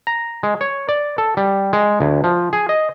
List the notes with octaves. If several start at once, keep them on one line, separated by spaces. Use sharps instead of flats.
A#5
G#3
C#5
D5
A4
G3
G#3
D2
F3
G#4
D#5